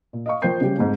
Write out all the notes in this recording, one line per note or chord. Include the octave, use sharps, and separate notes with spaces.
A#2
D#5 F5 C#6
F3 A#4 C5 G5 G6 C7
C#3 G3 G4
F2 G#2